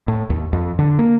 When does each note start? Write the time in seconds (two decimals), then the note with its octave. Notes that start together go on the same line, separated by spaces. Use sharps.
0.08 A2
0.30 D#2
0.53 F2
0.79 D3
0.99 A#3